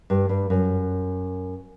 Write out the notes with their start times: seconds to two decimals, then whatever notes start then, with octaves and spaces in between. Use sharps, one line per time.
0.10 G2
0.29 G2
0.50 F#2